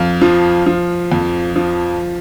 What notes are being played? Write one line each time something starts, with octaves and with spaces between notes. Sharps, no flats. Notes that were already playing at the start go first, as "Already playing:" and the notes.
Already playing: F2 F5
F3
F3
F2
F3